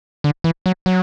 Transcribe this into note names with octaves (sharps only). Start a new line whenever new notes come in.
D3
E3
F#3
F#3